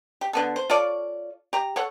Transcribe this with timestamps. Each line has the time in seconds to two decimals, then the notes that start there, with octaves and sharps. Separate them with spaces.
0.21 G4
0.33 D3 B3 A4
0.56 C5
0.70 F4 A4 C#5 D5
1.53 G4 A#5
1.76 A4 C#5 F#5